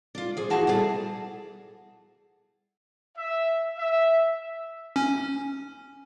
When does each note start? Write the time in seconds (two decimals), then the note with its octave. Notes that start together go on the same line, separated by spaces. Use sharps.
0.15 D4 F4
0.37 F3 G#4
0.50 E3 A#3 F4 F#4 G#4 A5
0.67 G3 E4 G#4 A4
3.18 E5
3.78 E5
4.96 C#4